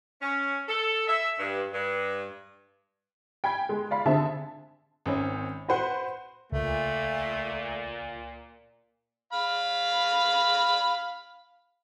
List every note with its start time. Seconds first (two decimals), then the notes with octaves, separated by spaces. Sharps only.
0.22 C#4
0.68 A4
1.07 E5
1.39 G2
1.72 G2
3.44 G5 G#5 B5 G#6
3.69 G#3
3.91 D5 F5 B5
4.06 D3 C4 G#4 E5 A5
5.06 G#1 C4 C#4
5.68 F#4 B4 C5 F#5 C6
6.52 C#2 A#2 A3
9.33 F5 B5